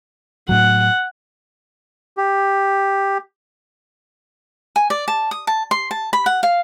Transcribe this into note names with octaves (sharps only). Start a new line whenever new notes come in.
A2 F#3 F#5
G4
G#5
D5
A5
D#6
A5
C6
A5
B5
F#5
F5